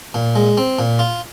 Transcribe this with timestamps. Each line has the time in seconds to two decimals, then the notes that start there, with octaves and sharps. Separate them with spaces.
0.14 A#2
0.35 G#3
0.57 C4
0.79 A#2
0.99 F4